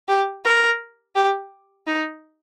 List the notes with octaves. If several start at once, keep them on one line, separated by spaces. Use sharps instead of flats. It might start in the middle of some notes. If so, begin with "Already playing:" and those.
G4
A#4
G4
D#4